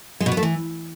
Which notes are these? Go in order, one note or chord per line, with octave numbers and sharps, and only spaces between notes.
G#3
B2
B3
A3
E3